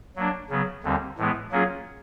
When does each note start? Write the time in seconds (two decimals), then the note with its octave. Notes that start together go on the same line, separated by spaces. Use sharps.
0.16 F#3 A#3 D4
0.50 C#3 F#3 B3
0.83 D#2 D3 G3 C4
1.18 A2 E3 G#3 B3
1.51 F#3 A#3 C#4 F4 G#4